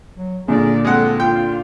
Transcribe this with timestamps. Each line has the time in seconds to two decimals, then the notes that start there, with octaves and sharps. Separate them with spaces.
0.17 F#3
0.48 A#2 D3 G#4 A#4 D5
0.85 G#3 C4 A4 F#5
1.20 F4 G5